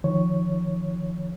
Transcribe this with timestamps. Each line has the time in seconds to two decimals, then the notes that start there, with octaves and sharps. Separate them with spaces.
0.04 D#3 F3 C#5